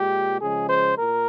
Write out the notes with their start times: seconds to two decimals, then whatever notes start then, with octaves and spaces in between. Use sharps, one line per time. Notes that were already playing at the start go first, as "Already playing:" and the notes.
Already playing: A#2 G#3 G4
0.41 C#3 F3 G#3 G#4
0.69 C5
0.98 A#2 A#4